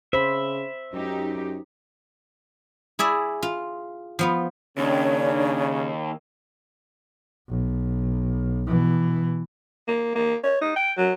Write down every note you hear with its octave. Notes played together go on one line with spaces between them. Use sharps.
C#3 C5 E5 B5
F#2 D#4 G4
E4 G#4 D5 E5
F4
F3 B3 F4
D#2 C#3 C#4 D4 C#5
B1
B2 E3
A#3
A#3
C#5
D#4
G5
F#3